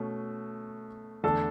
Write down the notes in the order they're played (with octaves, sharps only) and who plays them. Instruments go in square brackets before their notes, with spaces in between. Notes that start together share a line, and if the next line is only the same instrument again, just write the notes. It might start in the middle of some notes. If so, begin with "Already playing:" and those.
Already playing: [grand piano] B2 A3 C#4
E2 D3 A3 D4 A4